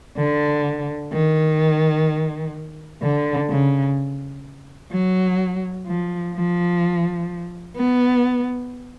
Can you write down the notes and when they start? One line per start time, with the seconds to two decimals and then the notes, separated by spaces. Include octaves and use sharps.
0.18 D3
1.13 D#3
3.03 D3
3.50 C#3
4.93 F#3
5.87 F3
6.35 F3
7.77 B3